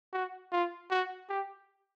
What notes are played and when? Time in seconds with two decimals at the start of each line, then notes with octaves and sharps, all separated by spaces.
0.13 F#4
0.52 F4
0.91 F#4
1.29 G4